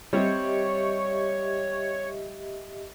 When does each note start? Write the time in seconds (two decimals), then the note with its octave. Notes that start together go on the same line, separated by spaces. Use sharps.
0.13 G3 C4 G4 C#5 D#5 E5